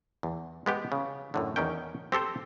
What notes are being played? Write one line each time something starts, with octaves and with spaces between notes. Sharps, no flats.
E2
G#3 B3 G4
C#3
F#2 A2 D3
E2 D#3 C#4 G5
C4 G4 A4 C5